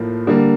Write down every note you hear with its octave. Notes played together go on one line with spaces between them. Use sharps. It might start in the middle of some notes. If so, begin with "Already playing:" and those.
Already playing: A2 F3 A#3 F4
D3 G3 A#3